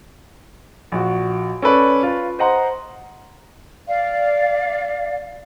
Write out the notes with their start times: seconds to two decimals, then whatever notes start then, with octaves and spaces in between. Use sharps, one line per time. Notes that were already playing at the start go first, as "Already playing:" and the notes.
0.92 A#1 F#4
1.62 C#4 A4 B4 D5
2.03 F4 B4
2.39 C5 D#5 F#5 A#5 C6
3.88 D5 F5